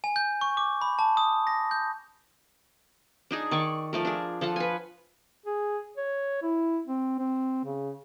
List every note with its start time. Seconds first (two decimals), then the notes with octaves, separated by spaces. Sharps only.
0.04 G#5
0.16 G6
0.41 C#6
0.57 D6
0.81 B5
0.99 A5
1.17 D#6
1.47 A#6
1.71 G6
3.31 D4 D#4 G#4
3.51 D#3 D5 C#6
3.93 F3 A3 A#4
4.05 D4 G#4
4.41 F3 A4 F5 F#5
4.56 B4 G#5
5.46 G#4
5.97 C#5
6.42 E4
6.87 C4
7.19 C4
7.65 C#3